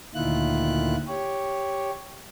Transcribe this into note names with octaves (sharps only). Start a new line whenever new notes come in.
D2 A#2 D#3 E4 F4 F#6
G4 C#5